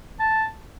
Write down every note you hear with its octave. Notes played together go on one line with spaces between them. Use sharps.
A5